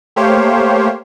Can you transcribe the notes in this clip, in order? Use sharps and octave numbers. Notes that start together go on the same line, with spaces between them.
A3 A#3 G4 C5 C#5 F5